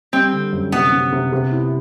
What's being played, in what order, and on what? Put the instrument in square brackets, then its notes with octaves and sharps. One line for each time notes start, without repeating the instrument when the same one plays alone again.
[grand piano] G3 [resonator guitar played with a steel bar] C4
[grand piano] D3
F#2
[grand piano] C3 [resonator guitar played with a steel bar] B3
[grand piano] C3
C3
C3
E4